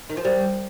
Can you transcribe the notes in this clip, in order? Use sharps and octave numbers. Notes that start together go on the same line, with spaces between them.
D#3
F3
G3